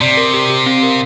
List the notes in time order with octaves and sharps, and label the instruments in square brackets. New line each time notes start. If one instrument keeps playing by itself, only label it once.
[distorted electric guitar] C3 [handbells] D5
[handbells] A#4
G4
G4
C4
A#4